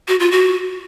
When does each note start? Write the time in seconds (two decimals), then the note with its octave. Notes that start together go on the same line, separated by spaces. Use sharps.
0.08 F#4
0.20 F4
0.32 F#4